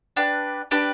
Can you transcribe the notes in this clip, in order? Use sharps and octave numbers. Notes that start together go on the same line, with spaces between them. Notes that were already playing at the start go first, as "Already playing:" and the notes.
D4 G4 B4
D4 G4 B4